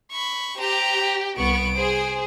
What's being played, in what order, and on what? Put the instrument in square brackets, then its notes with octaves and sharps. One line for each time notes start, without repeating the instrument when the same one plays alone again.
[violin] B5 C#6
[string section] G4 [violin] C5 A#5
[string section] C2 B3 C#6 [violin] D7
[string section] G#4 C5